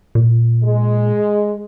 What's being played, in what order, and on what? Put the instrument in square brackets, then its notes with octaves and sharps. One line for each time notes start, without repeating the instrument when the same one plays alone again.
[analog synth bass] A#2
[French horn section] G#3